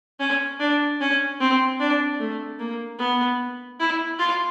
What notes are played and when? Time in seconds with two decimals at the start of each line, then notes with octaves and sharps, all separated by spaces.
0.20 C#4
0.60 D4
1.01 C#4
1.40 C4
1.80 D4
2.20 A3
2.59 A#3
2.99 B3
3.80 E4
4.19 F4